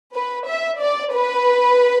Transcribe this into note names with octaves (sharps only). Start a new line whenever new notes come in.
B4
E5
D5
B4